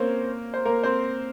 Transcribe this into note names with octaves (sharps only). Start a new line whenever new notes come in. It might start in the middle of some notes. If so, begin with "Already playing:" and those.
Already playing: A#3 C4 C#4 A#4 C5 C#5
C5
A#3 A#4
C4 C5